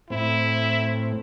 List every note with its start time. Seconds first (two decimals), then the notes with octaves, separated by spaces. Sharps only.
0.10 A2 C4 E4